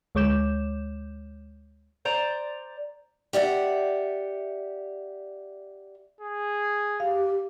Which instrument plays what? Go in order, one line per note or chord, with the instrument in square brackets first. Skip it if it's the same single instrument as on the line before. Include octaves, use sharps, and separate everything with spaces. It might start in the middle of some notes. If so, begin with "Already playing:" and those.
[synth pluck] D2 G#3 C#5 D6 G6 E7
[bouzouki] C5 D5 A#5
[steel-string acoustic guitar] G4 D5 E5 F#5
[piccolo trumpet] G#4
[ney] G4 [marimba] F5